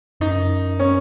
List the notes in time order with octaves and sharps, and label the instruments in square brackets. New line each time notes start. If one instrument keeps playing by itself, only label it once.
[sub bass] F#2 [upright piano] D#4
[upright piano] C#4